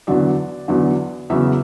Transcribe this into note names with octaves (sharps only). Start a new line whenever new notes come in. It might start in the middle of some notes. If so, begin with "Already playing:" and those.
E2 D3 F#3 D5
E2 D3 F#3
E2 C#3 F#3 E5